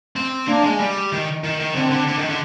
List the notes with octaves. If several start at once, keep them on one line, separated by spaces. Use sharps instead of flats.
C4
A#3 D4
G#3
G3
D#3
D#3
D#3
D3 C4
D3
D3
D#3
D3